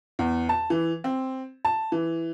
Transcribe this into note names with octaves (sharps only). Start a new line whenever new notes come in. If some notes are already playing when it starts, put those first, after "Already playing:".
E2
A5
E3
C4
A5
E3